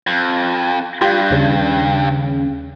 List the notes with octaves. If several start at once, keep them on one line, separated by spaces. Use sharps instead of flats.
F2
G2 F4 G4
D#2 C#3